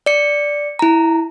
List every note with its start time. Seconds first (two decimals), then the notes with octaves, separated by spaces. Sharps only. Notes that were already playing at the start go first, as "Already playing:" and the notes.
0.06 D5 C#7
0.79 E4 A#5